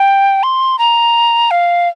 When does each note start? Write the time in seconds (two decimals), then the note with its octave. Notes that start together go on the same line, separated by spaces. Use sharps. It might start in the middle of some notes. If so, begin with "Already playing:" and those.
Already playing: G5
0.43 C6
0.79 A#5
1.51 F5